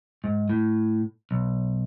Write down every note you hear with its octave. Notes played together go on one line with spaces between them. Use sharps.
G#2
A2
B1